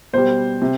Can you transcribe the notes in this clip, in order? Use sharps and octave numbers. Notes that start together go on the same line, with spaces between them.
B2 G3 C5
C3